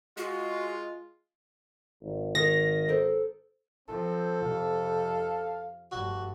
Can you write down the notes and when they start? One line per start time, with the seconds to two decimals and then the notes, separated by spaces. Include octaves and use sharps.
0.17 G#3 F4 F#4
2.02 G#1
2.35 D#3 A#6
2.88 A4 A#4 C5
3.88 F3 C4 A4
4.42 F2 C3 F5
5.92 F1 G2 F#4